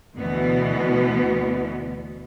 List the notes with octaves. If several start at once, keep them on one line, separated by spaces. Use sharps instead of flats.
D2 B2 E3 B3